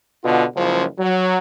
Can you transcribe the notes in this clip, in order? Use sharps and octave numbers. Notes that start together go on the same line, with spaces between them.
B2 D3 B3 F4
F#1 C#2 C#3 F3
F#3